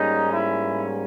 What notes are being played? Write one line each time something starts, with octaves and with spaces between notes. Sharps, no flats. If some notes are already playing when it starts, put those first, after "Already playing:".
Already playing: G#2 G3 A#3 C#4 D#4
E4